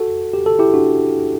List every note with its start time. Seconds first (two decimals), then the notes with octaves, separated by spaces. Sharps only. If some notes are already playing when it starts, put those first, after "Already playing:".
Already playing: F#4 A4
0.34 G4
0.46 A4
0.59 E4 G4
0.74 D4 F#4